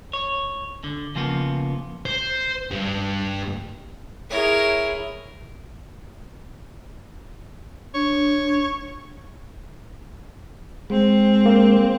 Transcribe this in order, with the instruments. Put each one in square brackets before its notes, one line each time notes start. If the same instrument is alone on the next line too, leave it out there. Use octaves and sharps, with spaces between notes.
[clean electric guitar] C#5
D3
C#3 F3 A#3 B3
[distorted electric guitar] C5
G2
[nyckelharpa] E4 G#4 [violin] A#4 C#5
[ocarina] D4 [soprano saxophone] C#5
[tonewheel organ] G#3 [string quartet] C4
[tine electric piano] A#3